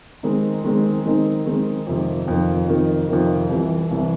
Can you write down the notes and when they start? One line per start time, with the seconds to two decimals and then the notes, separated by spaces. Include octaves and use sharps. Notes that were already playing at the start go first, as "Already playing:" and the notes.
0.23 D#3 G#3 C4 D#4
0.64 D#3 G#3 C4 D#4
1.05 D#3 G#3 C4 D#4
1.46 D#3 G#3 C4 D#4
1.87 F2 C3 D#3
2.28 F2 C3 D#3
2.68 F2 C3 D#3
3.09 F2 C3 D#3
3.50 C2 C3 E3
3.90 C2 C3 E3